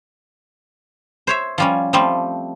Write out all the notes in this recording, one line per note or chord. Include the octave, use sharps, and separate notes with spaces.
C5 C#5 E5
F3 G3 C#4
F3 G3 A3 C4